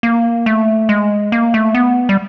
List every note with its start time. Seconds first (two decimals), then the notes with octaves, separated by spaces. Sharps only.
0.03 A#3
0.46 A3
0.89 G#3
1.32 A#3
1.54 A3
1.74 B3
2.09 G3